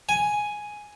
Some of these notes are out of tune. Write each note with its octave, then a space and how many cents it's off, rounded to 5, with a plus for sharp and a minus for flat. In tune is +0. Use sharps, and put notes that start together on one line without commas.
G#5 +5